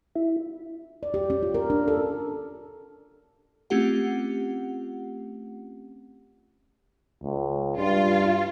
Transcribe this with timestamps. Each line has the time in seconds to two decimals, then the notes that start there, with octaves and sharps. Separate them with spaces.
0.16 E4
1.03 D5
1.14 G4
1.30 C#4
1.43 F4
1.54 A#4
1.70 D4
1.88 A4
3.70 A3 C4 C#4 F4 G4 F#5
7.23 C#2
7.78 G2 F4